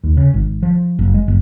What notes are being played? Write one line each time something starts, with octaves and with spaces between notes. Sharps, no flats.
D#2
C#3
G#1
F3
F#1
G#3
F#1